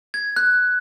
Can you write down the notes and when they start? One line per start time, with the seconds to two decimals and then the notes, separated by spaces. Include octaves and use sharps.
0.14 G#6
0.36 F#6